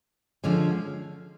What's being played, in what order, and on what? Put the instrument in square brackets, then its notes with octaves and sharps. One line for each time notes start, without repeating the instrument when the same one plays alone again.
[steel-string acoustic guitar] D3 F3 G#3 C#4